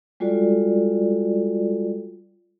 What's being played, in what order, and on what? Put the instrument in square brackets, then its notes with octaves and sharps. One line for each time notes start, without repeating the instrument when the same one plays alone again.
[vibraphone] G3 G#3 F4 F#4 A4 D5